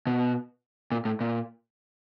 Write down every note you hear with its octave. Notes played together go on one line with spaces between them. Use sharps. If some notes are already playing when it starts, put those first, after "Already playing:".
B2
A#2
A2
A#2